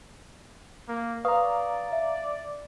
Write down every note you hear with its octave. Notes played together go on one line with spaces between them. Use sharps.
A#3
B4 D5 F5 A#5 C#6 D#6
E5